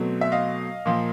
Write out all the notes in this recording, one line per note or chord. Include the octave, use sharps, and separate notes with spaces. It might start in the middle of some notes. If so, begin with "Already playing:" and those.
Already playing: B2 F#3 A3 C4
E5
D#5 F5
A#2 F3 A#3